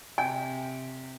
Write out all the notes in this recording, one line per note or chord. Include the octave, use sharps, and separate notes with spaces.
C3 G5 G#5